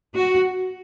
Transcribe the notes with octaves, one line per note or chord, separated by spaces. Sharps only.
F#4